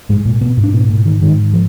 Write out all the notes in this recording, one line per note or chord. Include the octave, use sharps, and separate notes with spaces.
G#2 G#3
A#2 A#3
B2 B3
G#2
D4
B2 B3
A#2 A#3
D#3
G#2 D#3
F3